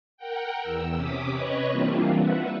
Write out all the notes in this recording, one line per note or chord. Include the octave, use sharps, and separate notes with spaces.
A#4 F#5 G5
E2 E6
C3 C#4 D6 D#6 B6
B4 C#5 D#5 B5 C#6
E3 G3 A#3 C4 D4 F4
B4 E5 F#5